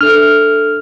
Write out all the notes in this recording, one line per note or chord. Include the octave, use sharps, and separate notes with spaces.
D4 A4 E5 F6